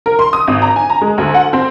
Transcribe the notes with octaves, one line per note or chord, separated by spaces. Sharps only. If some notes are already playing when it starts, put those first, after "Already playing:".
A#4
C6
D#6
G#1
A#5
G#5
A#5
G#3
D2
F#5
C4